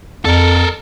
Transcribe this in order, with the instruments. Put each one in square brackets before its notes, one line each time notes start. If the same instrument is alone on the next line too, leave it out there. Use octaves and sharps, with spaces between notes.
[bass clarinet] F2 [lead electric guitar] A4 A#4